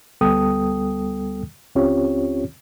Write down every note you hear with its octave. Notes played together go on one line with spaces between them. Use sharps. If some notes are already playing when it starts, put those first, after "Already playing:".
D2 G3 B3 A4 G5 D#6
C#2 C4 C#4 F4 G4 C#5